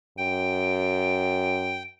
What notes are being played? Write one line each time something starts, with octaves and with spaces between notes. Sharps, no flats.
F#2 G5